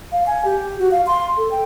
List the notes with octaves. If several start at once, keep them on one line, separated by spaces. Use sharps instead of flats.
F5
G#5
G4
F#4
F5
C6
A4
G5